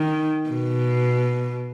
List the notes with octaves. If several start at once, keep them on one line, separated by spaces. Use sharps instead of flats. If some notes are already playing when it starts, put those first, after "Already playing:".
Already playing: D#3
B2